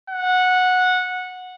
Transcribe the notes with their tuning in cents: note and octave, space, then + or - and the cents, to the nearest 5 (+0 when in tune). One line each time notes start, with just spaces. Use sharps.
F#5 -15